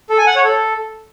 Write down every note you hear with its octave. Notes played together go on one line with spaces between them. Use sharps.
A4
G#5
F#5
C#5
A4